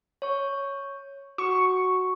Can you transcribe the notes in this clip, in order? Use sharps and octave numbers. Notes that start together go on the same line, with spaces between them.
C#5 C#6
F#4 C#6